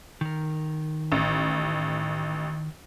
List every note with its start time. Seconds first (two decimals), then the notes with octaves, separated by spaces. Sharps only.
0.21 D#3 A#4
1.12 A1